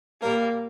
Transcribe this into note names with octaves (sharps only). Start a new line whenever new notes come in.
A#2 G3 A#3 A#4